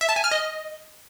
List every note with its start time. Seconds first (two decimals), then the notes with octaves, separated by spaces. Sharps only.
0.01 E5
0.09 A5
0.16 G#5
0.24 F6
0.31 D#5